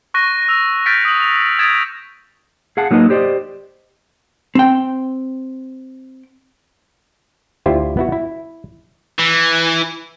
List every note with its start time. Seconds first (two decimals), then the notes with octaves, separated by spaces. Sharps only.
0.14 C#6 F#6 A#6 D#7
0.48 E6 F7
0.86 F6 G6 A6 B6 C#7 D7
1.05 D#6 F#7
1.20 F7
1.59 D#6 G#6 A6 B6 D7 E7
2.77 G#4 F5 F#5 A5
2.91 F#3 A#3 D#4 B4 D#5
3.10 G4 C5 D5 D#5
4.55 C4 G5
7.66 D2 E4 F4 G4 C5
7.97 B3 E4 F#4
8.12 E4
9.19 E3